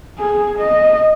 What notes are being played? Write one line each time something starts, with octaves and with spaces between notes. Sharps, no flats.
G#4
D#5